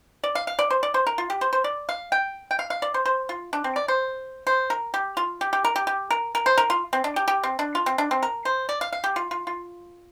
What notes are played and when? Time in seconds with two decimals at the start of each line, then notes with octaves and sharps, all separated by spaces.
0.24 D5
0.35 F5
0.47 F5
0.59 D5
0.70 C5
0.83 D5
0.94 C5
1.07 A#4
1.18 F4
1.30 G4
1.41 C5
1.53 C5
1.64 D5
1.89 F5
2.12 G5
2.51 G5
2.59 F5
2.70 F5
2.82 D5
2.94 C5
3.06 C5
3.29 F4
3.53 D4
3.64 C4
3.76 D5
3.88 C5
4.47 C5
4.70 A#4
4.94 G4
5.17 F4
5.41 G4
5.53 G4
5.64 A#4
5.76 G4
5.87 G4
6.11 A#4
6.35 A#4
6.46 C5
6.58 A#4
6.70 F4
6.93 C4
7.04 D4
7.16 G4
7.28 G4
7.43 C4
7.59 D4
7.75 F4
7.86 C4
7.98 D4
8.11 C4
8.23 A#4
8.45 C5
8.69 D5
8.81 F5
8.92 F5
9.04 G4
9.16 F4
9.31 F4
9.47 F4